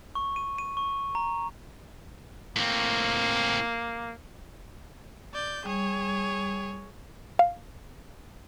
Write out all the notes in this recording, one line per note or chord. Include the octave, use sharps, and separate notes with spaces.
C#6
D#7
D#7
C#6
A#5
A2 A#3 C4
D5 G6
G3 G#4 C#5
F5